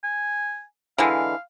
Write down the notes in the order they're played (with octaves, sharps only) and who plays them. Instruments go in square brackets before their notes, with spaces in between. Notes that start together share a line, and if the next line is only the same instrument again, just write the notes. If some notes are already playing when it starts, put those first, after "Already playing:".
[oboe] G#5
[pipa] D3 E3 G#3 [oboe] F5